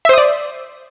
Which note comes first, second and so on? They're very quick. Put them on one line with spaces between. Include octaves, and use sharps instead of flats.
E5 C5 D#6 D5